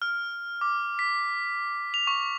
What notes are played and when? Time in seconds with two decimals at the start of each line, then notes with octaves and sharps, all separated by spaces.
0.02 F6
0.61 D6
0.99 B6
1.94 F7
2.07 C#6